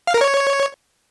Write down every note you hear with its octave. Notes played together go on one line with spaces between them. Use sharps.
F5
A#4
C#5